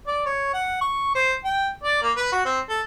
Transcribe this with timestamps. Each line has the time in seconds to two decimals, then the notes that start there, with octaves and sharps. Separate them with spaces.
0.07 D5
0.26 C#5
0.54 F#5
0.81 C#6
1.15 C5
1.44 G5
1.83 D5
2.02 A#3
2.17 B4
2.32 F#4
2.45 C4
2.69 A4